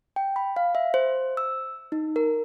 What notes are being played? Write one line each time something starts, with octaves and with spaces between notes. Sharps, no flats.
G5
B5
F5
E5
C5
E6
D#4
A#4